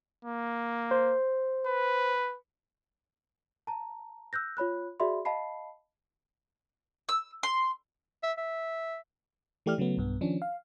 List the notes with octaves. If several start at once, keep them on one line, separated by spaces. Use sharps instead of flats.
A#3
C5
B4
A5 A#5
E6 F#6 G6 A#6
F4 C#5 B5 F#6
F#4 G#4 D5 E5 B5 C6
D#5 F5 A5 B5 C7
E6
C6
E5
E5
E3 A3 G4 D5 F6
C#3 F#3 A3 B3
B1 G2 B3
D#3 F3 C#4 D4
F5